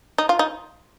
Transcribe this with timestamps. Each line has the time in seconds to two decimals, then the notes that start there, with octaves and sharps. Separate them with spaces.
0.18 D#4
0.29 F4
0.39 D#4